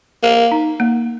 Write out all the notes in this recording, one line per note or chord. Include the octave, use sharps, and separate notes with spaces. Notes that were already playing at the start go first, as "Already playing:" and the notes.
A#3 A#4
D#4
A#3